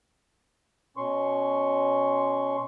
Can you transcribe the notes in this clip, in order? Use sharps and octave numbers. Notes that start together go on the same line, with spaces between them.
B2 C#4 C6 C#6